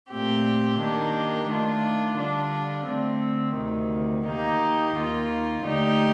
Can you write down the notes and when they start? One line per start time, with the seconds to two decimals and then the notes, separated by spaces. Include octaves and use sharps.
0.10 A#2 A3 C4 G4
0.79 D#3 A#3 D4 G4
1.48 D#3 A3 D4 F4
2.17 D3 G3 D4 F4
2.87 D3 A3 C4
3.56 D2 C3 D#3
4.25 D#3 A#3 D#4 G4
4.95 D#2 D#3 A#3 F4
5.64 D3 A3 D#4 G4